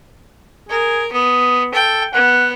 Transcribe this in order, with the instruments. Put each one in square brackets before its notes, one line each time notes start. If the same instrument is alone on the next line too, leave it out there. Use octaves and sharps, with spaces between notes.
[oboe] G#4 [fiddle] A#4
[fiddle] B3 [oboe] D#6
[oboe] A4 [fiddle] G5
[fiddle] B3 [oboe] F#5